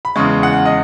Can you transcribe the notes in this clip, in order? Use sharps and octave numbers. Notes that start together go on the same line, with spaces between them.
B5
E2 C#3 G#3 C#6
F#5
D#5